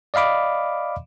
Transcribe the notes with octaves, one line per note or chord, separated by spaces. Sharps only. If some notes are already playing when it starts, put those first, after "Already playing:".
D5 D#5 F5 B5 D6